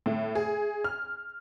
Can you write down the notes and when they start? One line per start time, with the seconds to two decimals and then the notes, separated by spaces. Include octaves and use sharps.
0.06 A2
0.35 G#4
0.84 F6